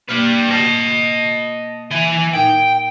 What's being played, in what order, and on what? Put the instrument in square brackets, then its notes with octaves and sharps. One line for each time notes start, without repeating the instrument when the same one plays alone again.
[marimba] B2 A#3 F6 [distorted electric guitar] G3 B4
[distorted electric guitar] D#5 A5
[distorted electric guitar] E3 G#5 [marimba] E5
[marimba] A#2 D#4 G#6 [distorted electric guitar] G5